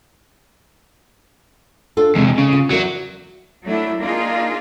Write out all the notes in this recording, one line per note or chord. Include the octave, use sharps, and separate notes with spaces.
D4 F4 A4
E2 C3 G#3
C#3
F4
E2 F#3 A#4 D5
F#3 A3 D4 E4
A#3 D4 D#4 F4 G#4